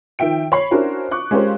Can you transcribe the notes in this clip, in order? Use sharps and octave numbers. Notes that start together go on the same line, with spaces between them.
D#3 F3 E5 G5 D7
C#5 B5 C7
C#4 D4 E4 F#4 A#4 C5
C#6 D6 F#6
G#3 C#4 F4 G4 A#4 C5